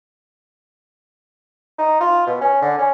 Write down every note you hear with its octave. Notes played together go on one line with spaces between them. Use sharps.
D#4
F4
B2
C#4
D3
C#4